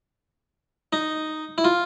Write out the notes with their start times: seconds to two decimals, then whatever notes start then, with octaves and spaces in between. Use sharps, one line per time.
0.93 D#4
1.58 E4
1.64 F4